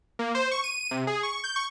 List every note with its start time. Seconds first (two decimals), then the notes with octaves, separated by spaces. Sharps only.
0.19 A#3
0.35 C5
0.51 C#6
0.64 D#7
0.91 C3
1.07 G#4
1.23 C#6
1.44 G6
1.56 C#6